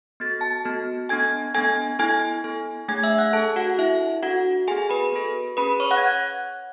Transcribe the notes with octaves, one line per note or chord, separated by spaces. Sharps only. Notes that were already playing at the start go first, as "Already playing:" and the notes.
B3 F#4 A4 A6
A5 A6
B3 F#4 A4
B3 D4 A4 G#5 G#6
B3 D4 A4 G#5 G#6
B3 E4 A4 G#5 G#6
B3 E4 A4
A3 D4 G#4 G#5 G#6
E5 E6
F#5 F#6
A3 D4 G#4 A4 A5
F#4 F#5
D4 E4 A4 E5
D4 F#4 A4 F#5
B3 F#4 G#4 A4 G#5
B4 B5
B3 F#4 A4
C#4 G#4 B4 B5
C#5 C#6
F#5 F#6
G#6